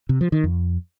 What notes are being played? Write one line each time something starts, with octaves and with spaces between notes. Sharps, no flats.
C3
F3
D#3
F2